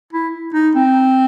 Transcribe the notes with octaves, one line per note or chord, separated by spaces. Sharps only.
E4
D#4
C4